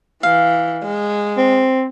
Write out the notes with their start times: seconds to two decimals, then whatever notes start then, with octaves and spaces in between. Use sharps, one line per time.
0.23 E3 F5
0.83 G#3
1.37 C4